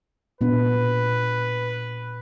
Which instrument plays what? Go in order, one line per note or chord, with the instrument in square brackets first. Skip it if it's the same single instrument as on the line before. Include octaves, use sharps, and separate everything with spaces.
[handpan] A#2 B3 D4 [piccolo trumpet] B4